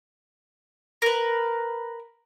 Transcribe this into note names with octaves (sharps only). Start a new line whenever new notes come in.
A#4 B4